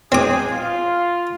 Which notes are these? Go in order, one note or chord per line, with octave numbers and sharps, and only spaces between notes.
G#3 C4 D#4 G#4 D6
F4